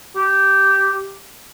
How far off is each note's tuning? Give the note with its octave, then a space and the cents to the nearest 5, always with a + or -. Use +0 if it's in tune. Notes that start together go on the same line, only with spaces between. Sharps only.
G4 -10